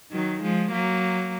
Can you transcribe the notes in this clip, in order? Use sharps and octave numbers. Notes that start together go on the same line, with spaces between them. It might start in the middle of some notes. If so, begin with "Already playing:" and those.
D#3 F#3
F3 G#3
F#3 A#3